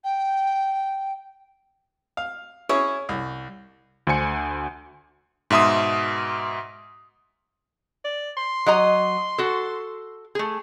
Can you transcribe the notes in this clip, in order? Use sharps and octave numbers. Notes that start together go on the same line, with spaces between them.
G5
F5
C#4 E4 G#4 C#5
C2
D2 D3 C5 G#5 C#7
G#2 B2 E5 C6 D#6
D5
C6
F#3 D#5 A#5
F#4 A4
A3 G#4